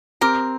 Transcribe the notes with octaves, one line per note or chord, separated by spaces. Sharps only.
C4 G4 A#4